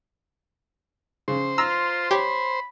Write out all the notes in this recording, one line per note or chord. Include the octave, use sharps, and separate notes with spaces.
C#3 C5
F4 A#5 E6
G4 C#5 B5